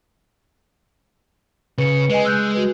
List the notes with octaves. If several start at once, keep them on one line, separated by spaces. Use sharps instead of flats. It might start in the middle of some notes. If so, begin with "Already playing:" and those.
C#3 B4 C#7
G#3 B4 D#5 G#5
E6 F#6 G6
F#4 B4